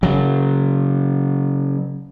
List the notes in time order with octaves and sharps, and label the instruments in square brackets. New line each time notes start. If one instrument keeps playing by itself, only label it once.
[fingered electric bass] C#3 F#3